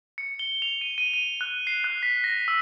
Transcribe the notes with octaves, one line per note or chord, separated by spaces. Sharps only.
C#7
G7
F7
D#7
D#7
D#7
F#6
C7
F#6
B6
A#6
E6